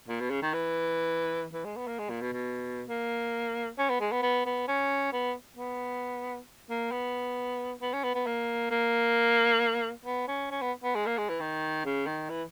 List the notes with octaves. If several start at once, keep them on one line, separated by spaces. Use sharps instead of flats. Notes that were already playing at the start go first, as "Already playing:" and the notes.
A#2
B2
C#3
D#3
E3
E3
G#3
B3
A#3
G#3
A#2
B2
B2
A#3
C#4
B3
G#3
B3
B3
B3
C#4
B3
B3
A#3
B3
B3
C#4
B3
B3
A#3
A#3
B3
C#4
C#4
B3
B3
G#3
A#3
G#3
E3
D#3
C#3
D#3
E3